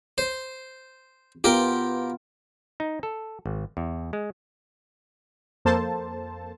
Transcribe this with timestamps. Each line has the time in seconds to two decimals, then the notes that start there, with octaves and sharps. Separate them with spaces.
0.18 C5
1.44 B3 F4 G4 A#4 G5
2.80 D#4
3.03 A4
3.46 G#1
3.77 E2
4.13 G#3
5.65 F2 A#3 A4 C5 A5